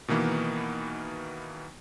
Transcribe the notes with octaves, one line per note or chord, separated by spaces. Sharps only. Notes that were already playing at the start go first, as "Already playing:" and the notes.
B2 D#3 E3 A#3 B3